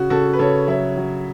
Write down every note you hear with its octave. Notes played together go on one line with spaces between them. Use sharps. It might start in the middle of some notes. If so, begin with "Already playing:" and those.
Already playing: C#3 F#4
C#3 F#4 A4
B4
C#3 A4 C#5
F#3 C#5 E5
F#3